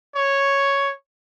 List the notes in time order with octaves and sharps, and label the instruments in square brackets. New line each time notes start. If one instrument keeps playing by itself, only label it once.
[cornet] C#5